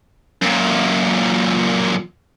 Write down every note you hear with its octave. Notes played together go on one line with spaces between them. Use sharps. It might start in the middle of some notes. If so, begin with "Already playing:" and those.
F#2 A#2